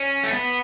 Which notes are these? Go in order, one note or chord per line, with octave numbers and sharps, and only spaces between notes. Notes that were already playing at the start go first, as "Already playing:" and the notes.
Already playing: C#4
A3
B3